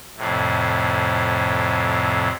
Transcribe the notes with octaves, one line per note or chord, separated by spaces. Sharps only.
F2 A2 C3